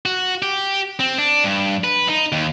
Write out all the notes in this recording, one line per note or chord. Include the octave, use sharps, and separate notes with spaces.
F#4
G4
C4
D4
G2
B4
D#4
D#2